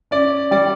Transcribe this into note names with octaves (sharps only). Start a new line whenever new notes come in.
C#4 D5
G3 D5